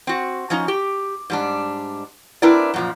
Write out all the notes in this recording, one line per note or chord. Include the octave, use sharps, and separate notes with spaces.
C4 F#4
F3 C#4 D#4
G4
G#2 G3 D4
C4 D4 E4 A#4 B4 D5
F#2 A#2 F3